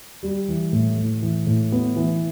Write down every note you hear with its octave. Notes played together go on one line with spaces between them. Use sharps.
G3
E3
A2
A2
E3
A2
B3
E3